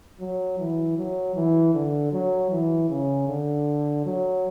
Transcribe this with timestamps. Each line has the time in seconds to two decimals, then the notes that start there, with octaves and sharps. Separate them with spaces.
0.20 F#3
0.59 E3
0.97 F#3
1.36 E3
1.74 D3
2.12 F#3
2.51 E3
2.89 C#3
3.28 D3
4.06 F#3